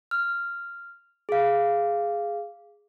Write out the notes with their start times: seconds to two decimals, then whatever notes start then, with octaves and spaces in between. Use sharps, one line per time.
0.11 F6
1.29 G#4 F5